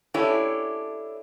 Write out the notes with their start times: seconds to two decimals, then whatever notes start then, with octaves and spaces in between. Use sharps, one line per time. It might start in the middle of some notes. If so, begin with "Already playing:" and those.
0.14 C#4 D4 E4 G4 A4 C#5